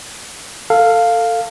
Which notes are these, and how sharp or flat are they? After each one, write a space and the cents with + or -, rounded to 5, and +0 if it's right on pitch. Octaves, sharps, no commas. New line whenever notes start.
A4 +25 F5 +0